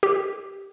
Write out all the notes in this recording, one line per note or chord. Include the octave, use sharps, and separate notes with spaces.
G4